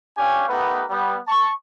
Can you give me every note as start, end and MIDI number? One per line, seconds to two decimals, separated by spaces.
0.17 0.47 61
0.17 0.47 62
0.17 0.47 67
0.17 0.47 73
0.17 0.47 77
0.17 0.47 80
0.48 0.83 57
0.48 0.83 59
0.48 0.83 63
0.48 0.83 67
0.48 0.83 70
0.48 0.83 71
0.90 1.16 55
0.90 1.16 59
1.27 1.50 81
1.27 1.50 85